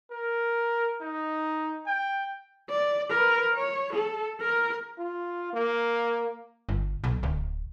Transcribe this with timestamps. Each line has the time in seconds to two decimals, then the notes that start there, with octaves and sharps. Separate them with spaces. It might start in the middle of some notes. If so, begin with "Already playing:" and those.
0.11 A#4
1.01 D#4
1.87 G5
2.70 D5
3.10 A#4 B4
3.53 C#5
3.93 A4
4.41 A#4
4.98 F4
5.53 A#3
6.69 G1
7.04 B1
7.23 D1